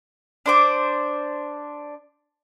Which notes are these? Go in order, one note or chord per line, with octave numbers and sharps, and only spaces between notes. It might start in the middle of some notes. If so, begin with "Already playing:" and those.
D4 C5 D6